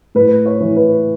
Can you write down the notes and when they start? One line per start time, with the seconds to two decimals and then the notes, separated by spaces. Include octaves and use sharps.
0.15 A2 B4
0.46 C#5
0.60 E3
0.76 B4